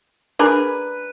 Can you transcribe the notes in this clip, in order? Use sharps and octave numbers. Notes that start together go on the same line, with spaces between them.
D4 G#4 A#4 B4